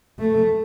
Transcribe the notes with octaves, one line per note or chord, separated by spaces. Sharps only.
A3